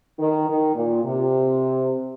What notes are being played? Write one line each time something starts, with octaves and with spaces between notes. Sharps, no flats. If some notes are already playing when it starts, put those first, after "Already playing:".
D#3
D#3
A#2
C3